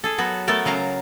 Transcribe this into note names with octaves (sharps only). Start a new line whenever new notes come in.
G#4 A4
F#3 B3 F#4
A3 B3 A4 A#4
C#3 F#3 F5 A#5